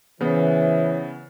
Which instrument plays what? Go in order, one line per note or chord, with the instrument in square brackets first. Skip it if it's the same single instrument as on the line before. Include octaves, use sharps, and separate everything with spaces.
[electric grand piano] C#3 B3 [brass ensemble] E3 [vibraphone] C5 C#5 E5